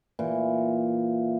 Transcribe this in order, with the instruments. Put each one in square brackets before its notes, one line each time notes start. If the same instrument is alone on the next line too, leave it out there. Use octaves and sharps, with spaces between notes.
[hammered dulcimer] A#2 E3